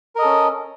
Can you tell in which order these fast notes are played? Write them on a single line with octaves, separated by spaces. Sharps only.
A#4 D#5 A4 C#4